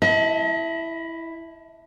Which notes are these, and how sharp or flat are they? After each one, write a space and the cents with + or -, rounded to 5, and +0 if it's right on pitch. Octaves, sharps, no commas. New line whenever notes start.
E4 +0 D#5 +40 A5 +0